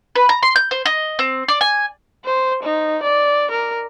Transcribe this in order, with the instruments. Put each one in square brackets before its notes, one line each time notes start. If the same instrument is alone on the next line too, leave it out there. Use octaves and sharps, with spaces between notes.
[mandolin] B4
A#5
C6
G6
C5
D#5
C4
D5
G#5
[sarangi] C5
D#4
D5
A#4